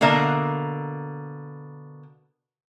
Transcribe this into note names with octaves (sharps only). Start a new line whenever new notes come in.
B2 D3 A#3 A#4 E5